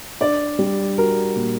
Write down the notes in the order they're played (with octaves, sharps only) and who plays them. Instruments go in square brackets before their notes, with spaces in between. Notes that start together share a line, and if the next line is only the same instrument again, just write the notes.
[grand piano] D4 [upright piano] D5
[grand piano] G3
[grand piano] F#4 [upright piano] A#4
[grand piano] A#2